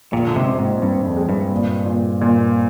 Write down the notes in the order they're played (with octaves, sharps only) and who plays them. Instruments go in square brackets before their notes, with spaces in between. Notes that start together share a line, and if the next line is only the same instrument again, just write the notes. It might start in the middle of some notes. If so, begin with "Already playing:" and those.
[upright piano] A#1 [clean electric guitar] A#2
[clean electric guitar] D3
G#2 C3
[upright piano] C4
[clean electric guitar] G#2
[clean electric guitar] G2 [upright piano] C4
[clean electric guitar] F2
[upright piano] G#3
[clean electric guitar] G2
[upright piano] A#2
A#2
A#2